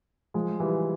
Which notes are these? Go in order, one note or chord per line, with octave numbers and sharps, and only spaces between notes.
F3 G#3
E3 G3